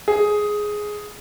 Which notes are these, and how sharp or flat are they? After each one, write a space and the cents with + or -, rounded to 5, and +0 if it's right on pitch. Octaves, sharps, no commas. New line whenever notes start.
G#4 +5